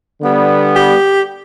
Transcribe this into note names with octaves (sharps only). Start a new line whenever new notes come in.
D3 G3 B3
G4